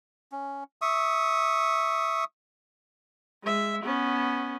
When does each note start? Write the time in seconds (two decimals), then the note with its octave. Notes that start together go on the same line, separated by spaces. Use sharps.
0.32 C#4
0.82 E5 C#6 D#6
3.43 G#3 E5
3.83 B3 C#4